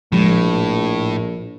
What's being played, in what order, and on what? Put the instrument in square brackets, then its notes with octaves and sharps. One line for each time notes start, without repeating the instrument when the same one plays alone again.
[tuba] A#1 [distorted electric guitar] A2 [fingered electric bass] F3 G#3